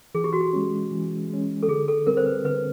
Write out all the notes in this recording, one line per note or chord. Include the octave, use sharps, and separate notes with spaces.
E3 G#4
G4
F#4
G4
G#3 C#4
E3
G#3 C#4
A4
D3 G#4
A4
G3 C4 A#4
C5
B4
D3 B4